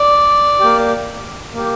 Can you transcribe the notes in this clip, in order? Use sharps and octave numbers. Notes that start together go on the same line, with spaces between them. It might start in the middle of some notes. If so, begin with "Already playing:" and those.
Already playing: D5
A#3 G4
A#3 G4